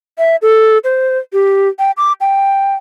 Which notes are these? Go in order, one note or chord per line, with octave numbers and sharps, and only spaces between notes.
E5
A4
C5
G4
G5
D6
G5